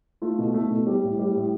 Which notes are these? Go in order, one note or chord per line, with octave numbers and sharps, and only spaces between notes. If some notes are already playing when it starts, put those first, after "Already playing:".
A3 F4
B2
A3
B2
G3
A2
G3
A2